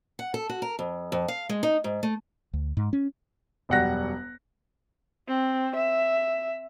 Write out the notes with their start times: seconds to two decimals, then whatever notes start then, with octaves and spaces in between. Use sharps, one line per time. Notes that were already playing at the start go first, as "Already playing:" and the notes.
0.19 F#5
0.34 A4
0.49 F#4
0.62 A#4
0.79 F2
1.12 F2
1.28 F5
1.49 G#3
1.63 D#4
1.84 G#2
2.03 A3
2.53 D2
2.77 G#2
2.93 C#4
3.69 E1 F#2 G3 F#5 F#6 A#6
5.28 C4
5.76 E5